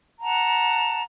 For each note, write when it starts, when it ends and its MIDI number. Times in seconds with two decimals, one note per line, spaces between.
0.20 1.01 78
0.20 1.01 81
0.20 1.01 82